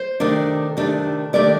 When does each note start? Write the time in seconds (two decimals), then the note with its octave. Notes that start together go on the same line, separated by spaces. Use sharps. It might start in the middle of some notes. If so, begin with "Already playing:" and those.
Already playing: C5
0.20 C3 D#3 A3 D4
0.77 C3 D#3 A3 D4
1.33 C3 D#3 A3 D4 D5